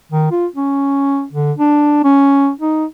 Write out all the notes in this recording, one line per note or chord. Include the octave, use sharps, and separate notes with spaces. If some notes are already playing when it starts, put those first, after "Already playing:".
D#3
F4
C#4
D3
D4
C#4
D#4